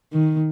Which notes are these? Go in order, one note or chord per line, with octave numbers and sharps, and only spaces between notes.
D#3